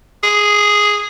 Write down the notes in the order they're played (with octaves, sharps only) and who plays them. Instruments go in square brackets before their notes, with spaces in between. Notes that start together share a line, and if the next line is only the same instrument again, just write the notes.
[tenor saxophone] G#4